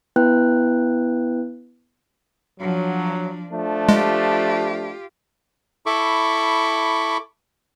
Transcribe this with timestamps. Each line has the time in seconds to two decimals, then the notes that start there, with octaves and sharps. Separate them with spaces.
0.16 B3 E4 B4 G5 F#6
2.60 F3 F#3 D4
3.51 F3 A3 D4
3.89 G#3 F4 G4
5.86 E4 A4 B5 C#6 D6